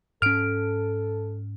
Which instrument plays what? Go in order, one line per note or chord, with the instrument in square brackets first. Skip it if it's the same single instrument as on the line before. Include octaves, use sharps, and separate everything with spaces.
[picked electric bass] G#2 C#4 [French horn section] A4 [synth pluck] F6 D7